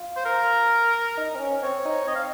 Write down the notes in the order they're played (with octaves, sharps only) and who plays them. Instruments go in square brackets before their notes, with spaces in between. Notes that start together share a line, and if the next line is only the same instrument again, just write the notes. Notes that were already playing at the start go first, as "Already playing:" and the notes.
Already playing: [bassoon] F4
[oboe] C5
A#4
[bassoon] D#4
C4
C#4
[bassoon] C4 [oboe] C#5
[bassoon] D#4
[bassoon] C4 [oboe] D#5
[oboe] F5